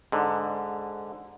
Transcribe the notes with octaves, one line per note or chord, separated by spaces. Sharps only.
G#2 D3